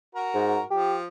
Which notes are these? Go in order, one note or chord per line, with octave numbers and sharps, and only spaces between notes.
F#4 A#4
G#2
F3 G4